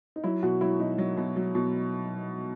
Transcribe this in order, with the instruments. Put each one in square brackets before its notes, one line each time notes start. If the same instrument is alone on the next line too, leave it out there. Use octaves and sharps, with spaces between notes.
[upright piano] D#4
F#3 E4
B2 F#4
F#3 E4
B2 D#4
F#3
B2
F#3
B2